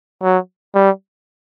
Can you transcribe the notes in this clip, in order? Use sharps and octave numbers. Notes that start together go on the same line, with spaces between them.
F#3
G3